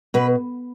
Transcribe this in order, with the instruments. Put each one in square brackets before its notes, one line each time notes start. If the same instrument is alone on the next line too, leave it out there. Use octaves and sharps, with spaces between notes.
[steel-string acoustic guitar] B2 B4